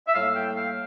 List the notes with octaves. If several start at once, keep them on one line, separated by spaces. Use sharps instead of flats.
E5
A2 G3 A#3 F5
G5
F5